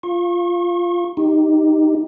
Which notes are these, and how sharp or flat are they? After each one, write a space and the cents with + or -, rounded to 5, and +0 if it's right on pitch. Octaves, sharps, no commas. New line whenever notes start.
F4 -5 C#6 -40
D#4 +0 G4 +0